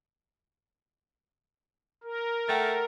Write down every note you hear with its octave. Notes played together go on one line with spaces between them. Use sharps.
A#4
A3 F#5 G5 A6